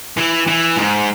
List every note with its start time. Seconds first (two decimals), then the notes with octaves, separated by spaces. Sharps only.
0.17 E3
0.47 E3
0.77 G#2